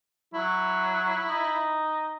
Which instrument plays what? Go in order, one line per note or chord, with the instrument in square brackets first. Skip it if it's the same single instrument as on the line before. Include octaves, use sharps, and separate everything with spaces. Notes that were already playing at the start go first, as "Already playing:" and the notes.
[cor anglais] F#3 [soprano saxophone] E4
[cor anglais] D#4